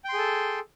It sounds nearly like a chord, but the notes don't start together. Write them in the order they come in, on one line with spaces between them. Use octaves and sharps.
G5 C6 G#4 A4